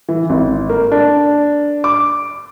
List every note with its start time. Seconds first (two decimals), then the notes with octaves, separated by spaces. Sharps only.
0.09 E3
0.30 G#1
0.69 A#3
0.92 D4
1.84 D6